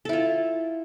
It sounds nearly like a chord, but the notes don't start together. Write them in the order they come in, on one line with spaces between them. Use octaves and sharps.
A4 E4 F4